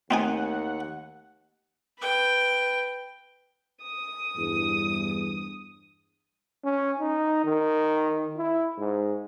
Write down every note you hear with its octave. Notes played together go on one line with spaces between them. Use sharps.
D#2 A3 C4 D#4 F#5 G#5
B4 G5
D#6
E2 G2
C#4
D#4
D#3
E4
G#2